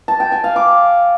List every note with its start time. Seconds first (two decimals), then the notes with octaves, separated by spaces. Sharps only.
0.08 A5
0.20 G5
0.32 G#5
0.44 F5
0.56 D6